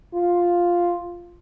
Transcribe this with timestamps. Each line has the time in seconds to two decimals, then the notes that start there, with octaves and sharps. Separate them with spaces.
0.14 F4